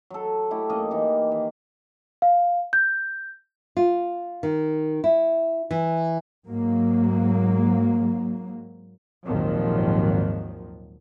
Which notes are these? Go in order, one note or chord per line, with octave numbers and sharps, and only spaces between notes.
F#3 A4
A3 E4 G4
F#2 A#3 D#4 D#5
E3 D#4 G4
D#3
F5
G6
F4
D#3
E4
E3
G#2 F#3 A#3
G#1 D#2 A#2 D#3 F3 F#3